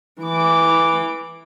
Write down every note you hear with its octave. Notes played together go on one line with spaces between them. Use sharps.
E3 D6